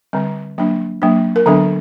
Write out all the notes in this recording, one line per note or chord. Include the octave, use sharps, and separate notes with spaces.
D3 G3 C4
F#3 A#3 D4
F#3 A#3 D4
A#4
D3 F#3 B3 D4 A4